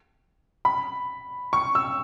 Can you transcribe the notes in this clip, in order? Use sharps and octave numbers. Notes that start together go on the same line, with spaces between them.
B5
C#6
E6